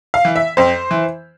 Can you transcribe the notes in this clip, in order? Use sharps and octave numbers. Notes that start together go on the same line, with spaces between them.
F5
E3
E5
F2 C5
E3